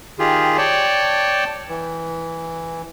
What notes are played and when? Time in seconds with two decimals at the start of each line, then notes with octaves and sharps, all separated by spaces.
0.19 D#3 F4 G4 G#4
0.58 C#5 D5 G5 A5
1.69 E3